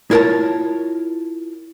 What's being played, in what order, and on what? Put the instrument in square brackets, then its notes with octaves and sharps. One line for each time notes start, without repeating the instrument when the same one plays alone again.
[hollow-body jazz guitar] E4 F4 A#4 C#5 A5